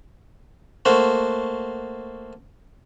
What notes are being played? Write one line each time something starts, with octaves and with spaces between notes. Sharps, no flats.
A3 A#3 F#4 C5